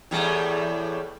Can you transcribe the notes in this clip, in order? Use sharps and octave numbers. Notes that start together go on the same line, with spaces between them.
E2 A2 G3